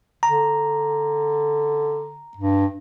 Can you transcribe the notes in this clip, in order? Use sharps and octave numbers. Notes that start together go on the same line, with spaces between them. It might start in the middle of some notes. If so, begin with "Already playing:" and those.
D3 A#5
G2